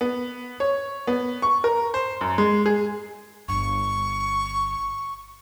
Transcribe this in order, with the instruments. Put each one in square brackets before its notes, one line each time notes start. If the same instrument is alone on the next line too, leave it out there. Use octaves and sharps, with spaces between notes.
[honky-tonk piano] B3
C#5
B3
C#6
A#4
C5
F#2
G#3
G#4
[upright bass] G1 [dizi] C#6